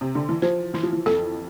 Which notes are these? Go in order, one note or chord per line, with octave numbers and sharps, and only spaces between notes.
C3
D3
E3
F3 C5
E3 E4
F3
E3
F2 A4